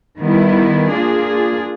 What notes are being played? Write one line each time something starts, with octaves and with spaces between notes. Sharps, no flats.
D#3 G3 B3 E4
A#3 D4 F4 G#4